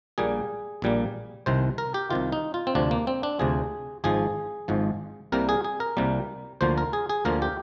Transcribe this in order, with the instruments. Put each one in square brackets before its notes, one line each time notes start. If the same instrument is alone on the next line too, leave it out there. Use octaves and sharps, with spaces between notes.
[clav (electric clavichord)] A#1 A#2 G3 A#3 G#4
A#1 A#2 G3 A#3
C2 C3 D#3 C5
A#4
G4
C2 C3 D#3 F4
D#4
F4
C4
D2 C3 F3 D4
A#3
C4
D4
D2 C3 F3 G#4
G#1 G#2 F3 G#4
G#1 G#2 F3
C2 C3 G3 A#3 A#4
G#4
G#4
A#4
C2 C3 G3 A#3
D2 D3 F3 A#3 C5
A#4
G#4
G#4
D2 D3 F3 A#3 A#4
G4